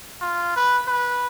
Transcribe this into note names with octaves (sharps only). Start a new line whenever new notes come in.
F4
B4
B4